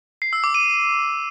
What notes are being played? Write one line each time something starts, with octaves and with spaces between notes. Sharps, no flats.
C7
E6
D6
D#7